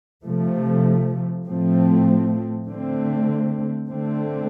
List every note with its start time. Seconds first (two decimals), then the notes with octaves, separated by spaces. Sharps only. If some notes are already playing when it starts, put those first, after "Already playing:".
0.24 C3 F3 A3
1.45 A2 F3 A3 C4
2.67 D3 A3 C4
3.88 D3 A3 C4